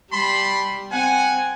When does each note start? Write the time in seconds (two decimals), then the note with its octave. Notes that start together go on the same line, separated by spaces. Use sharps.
0.12 G3 A5 B5 C6
0.92 C4 F#5 G#5